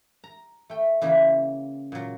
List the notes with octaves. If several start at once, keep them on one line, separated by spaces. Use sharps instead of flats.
A#5
A3 G5
C#3 E3 A#3 G5
A#2 F#3